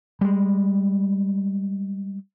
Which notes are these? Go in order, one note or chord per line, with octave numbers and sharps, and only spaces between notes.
G3 G#3